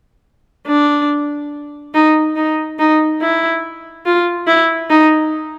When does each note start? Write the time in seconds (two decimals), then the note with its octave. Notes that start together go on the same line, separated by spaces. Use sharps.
0.67 D4
1.94 D#4
2.36 D#4
2.79 D#4
3.21 E4
4.06 F4
4.47 E4
4.90 D#4